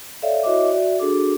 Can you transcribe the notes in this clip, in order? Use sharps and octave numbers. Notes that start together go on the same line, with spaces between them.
A4 C#5 D5 E5 F5
E4 F#4 C#5 D#5 E5 D6
F#4 D5 E5
D4 F#4 G#4 A4 D6